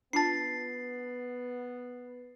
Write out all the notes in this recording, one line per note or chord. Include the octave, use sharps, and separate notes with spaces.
B3 D4 F4 A5 A6 C7